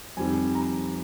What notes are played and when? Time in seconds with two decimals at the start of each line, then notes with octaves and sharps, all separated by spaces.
0.17 F2 D#3 G3 C4 G#5
0.55 A#5